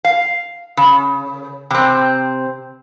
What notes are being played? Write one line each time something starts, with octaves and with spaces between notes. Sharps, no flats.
F5
C#3
C3 C4